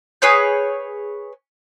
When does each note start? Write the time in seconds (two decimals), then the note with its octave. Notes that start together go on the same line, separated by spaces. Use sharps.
0.22 G#4 B4 C#5 G6